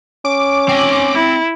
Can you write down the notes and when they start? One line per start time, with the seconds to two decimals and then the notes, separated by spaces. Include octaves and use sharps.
0.25 C#4 D6
0.69 C4 G#5
1.14 E4